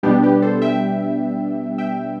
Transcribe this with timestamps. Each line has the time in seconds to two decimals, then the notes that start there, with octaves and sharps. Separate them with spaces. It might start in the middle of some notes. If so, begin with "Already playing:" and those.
0.03 B2 G3 B3 D4 G4
0.23 G4 B4
0.42 A4 C5
0.62 E5 G5
1.78 E5 G5